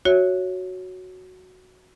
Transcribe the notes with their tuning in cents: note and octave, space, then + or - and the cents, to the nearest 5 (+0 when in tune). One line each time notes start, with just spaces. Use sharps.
F#4 +0 C#5 +0 E5 +0